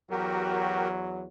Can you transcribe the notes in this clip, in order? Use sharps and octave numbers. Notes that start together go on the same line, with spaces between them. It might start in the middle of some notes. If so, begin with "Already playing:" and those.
E2 F#3 F#4 G4 A#4